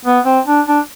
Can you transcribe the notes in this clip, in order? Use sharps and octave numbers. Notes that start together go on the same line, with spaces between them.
B3
C4
D4
D4